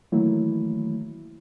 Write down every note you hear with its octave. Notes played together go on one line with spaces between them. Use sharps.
D#3 E3 F#3 A3 A#3 E4